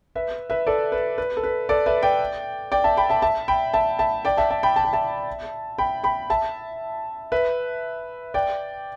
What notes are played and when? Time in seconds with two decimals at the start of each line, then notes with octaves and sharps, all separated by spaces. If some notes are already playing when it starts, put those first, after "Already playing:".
0.15 B4 E5
0.50 B4 E5
0.67 A4 D5
0.92 B4
1.18 B4
1.37 A4
1.43 B4
1.69 A4 D5
1.86 B4 E5
2.03 D5 G5
2.72 D5 G5
2.84 E5 A5
2.97 G5 B5
3.10 E5 A5
3.22 E5 A5
3.48 G5 B5
3.74 E5 A5
3.99 E5 A5
4.25 D5 G5
4.37 E5 A5
4.50 E5 A5
4.63 G5 B5
4.76 A5
4.84 G5
4.93 E5 A5
5.78 G5 B5
6.04 G5 B5
6.30 E5 A5
7.32 B4 E5
8.34 D5 G5